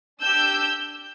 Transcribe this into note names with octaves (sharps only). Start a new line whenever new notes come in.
D4 G4 E6 G6